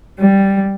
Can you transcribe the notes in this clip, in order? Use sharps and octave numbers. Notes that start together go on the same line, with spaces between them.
G3